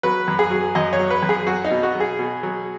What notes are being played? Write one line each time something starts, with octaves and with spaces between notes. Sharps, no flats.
F#3 B4
F#2
G#4
F#3
F#2 D#5
C#5
F#3
B4
F#2
G#4
F#3 F#4
D#4
B2
F#4
F#3
G#4
B2
F#3